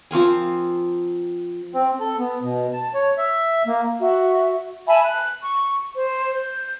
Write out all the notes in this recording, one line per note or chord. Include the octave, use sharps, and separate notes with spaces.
F3 C4 A#4 G#5
C4
A4
B3
B2
A5
C#5
E5
A#3
F#4 E5
E5 G#5 A5 B5
F#6
C#6
C5
G6